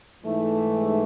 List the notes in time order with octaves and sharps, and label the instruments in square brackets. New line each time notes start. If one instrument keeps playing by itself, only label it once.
[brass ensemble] G#2 E3 A3